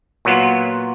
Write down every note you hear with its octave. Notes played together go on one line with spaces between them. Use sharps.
A#2 F#3 B3 F4